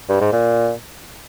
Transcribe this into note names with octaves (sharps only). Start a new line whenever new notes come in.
G2
G#2
A#2